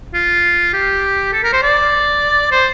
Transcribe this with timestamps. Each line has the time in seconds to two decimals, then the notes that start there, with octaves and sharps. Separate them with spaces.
0.14 F4
0.73 G4
1.33 A4
1.43 A#4
1.53 C5
1.62 D5
2.51 C5